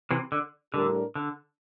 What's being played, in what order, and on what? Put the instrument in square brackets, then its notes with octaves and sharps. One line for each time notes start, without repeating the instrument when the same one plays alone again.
[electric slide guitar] C3 E3
D3
[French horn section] A2 G3 D4 G4 A#4 [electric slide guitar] D3
[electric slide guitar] D3